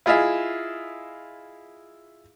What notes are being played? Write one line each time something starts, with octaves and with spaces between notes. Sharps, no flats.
E4 F4 G#4 D#5 E5